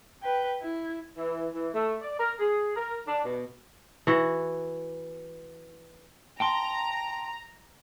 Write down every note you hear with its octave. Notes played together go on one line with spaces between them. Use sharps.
B4 G5
E4
E3
E3
A3
D5
A#4
G#4
A#4
D4
B2
E3 F#4
G5 A5 A#5 C6